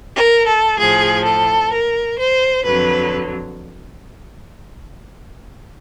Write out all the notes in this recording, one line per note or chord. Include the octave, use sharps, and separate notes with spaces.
A#4
A4
A2 F3 G#4
A4
A#4
C5
F2 D3 F#3 B4